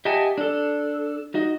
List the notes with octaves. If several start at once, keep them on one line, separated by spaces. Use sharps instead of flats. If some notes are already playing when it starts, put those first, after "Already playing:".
G4 D#5 E5 F#5 G#5 A5
D4 A4
D#4 F#4 D#5